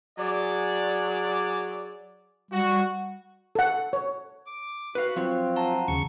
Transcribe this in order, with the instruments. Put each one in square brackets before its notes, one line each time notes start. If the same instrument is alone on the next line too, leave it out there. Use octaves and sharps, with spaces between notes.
[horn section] F#3 G#4 D5
[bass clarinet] G3 [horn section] F#4
[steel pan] A4 F#5
C#5
[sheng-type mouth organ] D6
[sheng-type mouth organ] F#4 F#5 [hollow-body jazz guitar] B4 F5 [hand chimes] F#6
[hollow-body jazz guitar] F3 F#3 C#5 [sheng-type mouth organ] C4 [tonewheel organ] F4
[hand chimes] F#5 A5 A#5
[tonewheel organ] D#2 C#3 C#6